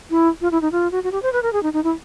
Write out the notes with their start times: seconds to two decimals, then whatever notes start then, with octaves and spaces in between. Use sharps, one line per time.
0.10 E4
0.41 F4
0.51 E4
0.62 D#4
0.72 F4
0.92 F#4
1.04 F#4
1.12 G4
1.23 C5
1.33 B4
1.43 A#4
1.53 G#4
1.63 D#4
1.73 D#4
1.84 E4